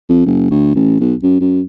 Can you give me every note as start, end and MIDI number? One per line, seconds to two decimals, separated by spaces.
0.09 0.22 41
0.26 0.50 30
0.51 0.75 38
0.75 0.95 33
1.00 1.14 35
1.23 1.37 42
1.41 1.61 42